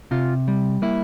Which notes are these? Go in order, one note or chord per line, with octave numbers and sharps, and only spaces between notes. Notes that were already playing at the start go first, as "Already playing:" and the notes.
C3 F4
G3
A#3 E4